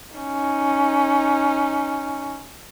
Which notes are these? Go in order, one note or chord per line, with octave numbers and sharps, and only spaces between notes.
C#4 D#4